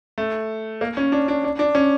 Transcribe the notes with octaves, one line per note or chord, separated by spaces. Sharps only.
A3
A#3
C#4
D4
D4
D4
D4
C#4